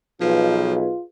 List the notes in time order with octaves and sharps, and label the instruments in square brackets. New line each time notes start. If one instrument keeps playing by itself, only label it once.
[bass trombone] B1 [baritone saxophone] F3 [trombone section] F4 [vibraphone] G#4 B4 D#5